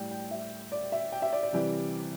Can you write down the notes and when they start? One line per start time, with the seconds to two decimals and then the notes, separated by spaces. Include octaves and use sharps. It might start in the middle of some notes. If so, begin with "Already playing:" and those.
Already playing: A2 G3 G5
0.11 G5
0.31 E5
0.72 D5
0.92 E5
1.12 G5
1.22 E5
1.33 D5
1.43 D5
1.53 C3 E3 G3